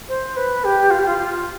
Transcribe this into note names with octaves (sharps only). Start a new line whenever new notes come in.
C5
B4
G4
F4
G4
F4
F4